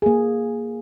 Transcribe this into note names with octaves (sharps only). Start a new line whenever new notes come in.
A#3 G#4